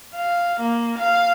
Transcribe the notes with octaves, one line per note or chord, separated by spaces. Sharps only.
F5
A#3
F5